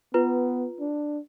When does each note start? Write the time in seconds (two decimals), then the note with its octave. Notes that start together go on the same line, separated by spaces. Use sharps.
0.14 B3 F4 B4
0.80 D4